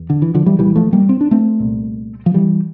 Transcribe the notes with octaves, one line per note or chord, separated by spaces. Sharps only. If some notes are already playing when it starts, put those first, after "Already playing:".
Already playing: E2
D3
E3
D3 F3
E3 G3
C2 A#2 E3 G3
F3 A3
G3 A#3
C4
D4
A3 C4
C2 A#2
F3
E3 G3